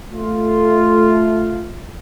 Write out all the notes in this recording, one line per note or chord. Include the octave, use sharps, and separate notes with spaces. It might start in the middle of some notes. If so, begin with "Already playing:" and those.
A3 F4